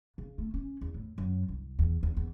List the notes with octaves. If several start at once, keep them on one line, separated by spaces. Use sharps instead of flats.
C#3
A3
C#4
E2
A2
F#2
C2
E2
E2
E2